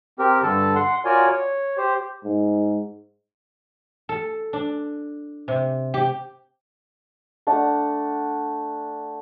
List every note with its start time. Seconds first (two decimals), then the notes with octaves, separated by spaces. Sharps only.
0.19 C4 G4 A#4
0.43 G2 D3 A4 A5
0.75 F#5 C6
1.05 F4 F#4 A#4 C#5 D5 G#5
1.28 C#5
1.77 G4 C5
2.24 G#2
4.09 A4
4.53 D4
5.48 C3
5.94 G4
7.47 A3 D4 F#5